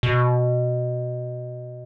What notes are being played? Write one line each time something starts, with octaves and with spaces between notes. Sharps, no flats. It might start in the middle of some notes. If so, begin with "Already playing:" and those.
B2